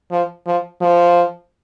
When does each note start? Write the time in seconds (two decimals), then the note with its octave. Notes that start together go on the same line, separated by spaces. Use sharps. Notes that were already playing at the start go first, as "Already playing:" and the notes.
0.11 F3
0.46 F3
0.81 F3